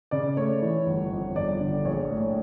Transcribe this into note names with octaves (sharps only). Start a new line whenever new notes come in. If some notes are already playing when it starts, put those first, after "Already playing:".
C#3 D5
A3 C#5
E3
G1
F2
G1 D5
D3
A#1 C#5
A2